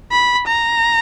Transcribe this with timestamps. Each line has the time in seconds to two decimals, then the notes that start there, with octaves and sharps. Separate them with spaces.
0.12 B5
0.48 A#5